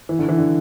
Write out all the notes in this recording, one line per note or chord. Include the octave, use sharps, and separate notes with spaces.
E3
D3
E3
D3